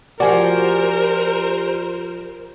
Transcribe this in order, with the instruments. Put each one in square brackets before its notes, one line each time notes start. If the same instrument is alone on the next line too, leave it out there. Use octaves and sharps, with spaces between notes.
[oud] F3 F#4 [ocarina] G4 [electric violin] A#4 C5 [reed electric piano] D5 G#5